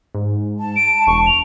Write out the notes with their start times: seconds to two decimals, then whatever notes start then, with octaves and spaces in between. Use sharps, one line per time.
0.14 G#2
0.59 A5
0.76 D7
1.07 E1 C#6
1.26 F7